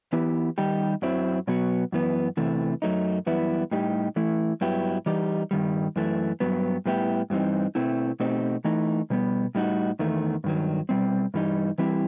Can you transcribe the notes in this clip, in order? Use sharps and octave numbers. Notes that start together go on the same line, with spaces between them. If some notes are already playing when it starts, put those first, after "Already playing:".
E3 B3 E4 G4
D#3 G3 D#4 G4
F#2 F#3 C4 E4
B2 F#3 B3 F#4
F#2 E3 B3
E2 C3 E3 A3
F#2 F#3 A3 D#4
F#2 E3 G3 B3 E4
A2 G3 D#4 G4
E3 A3 E4
G2 F#3 B3 E4 G4
E3 G3 D#4 G4
G2 D#3 G3
F#2 E3 A3
G2 F#3 B3
A2 G3 B3 E4 G4
G2 E3 G3 C4 D#4
B2 A3 C4 E4
B2 A3 C4 D#4 G4
E3 A3 D#4
B2 G3 B3
A2 G3 D#4 F#4
E2 D#3 A3
G2 D#3 F#3
B2 G3 C4
G2 E3 G3 D#4
E3 G3 C4 E4 G4